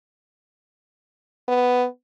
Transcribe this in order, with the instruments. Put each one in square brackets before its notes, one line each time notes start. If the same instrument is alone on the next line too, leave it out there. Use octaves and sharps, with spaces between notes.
[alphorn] B3